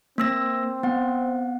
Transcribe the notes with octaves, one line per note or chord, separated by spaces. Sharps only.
A#3 C4 E6 A#6
B3 F#5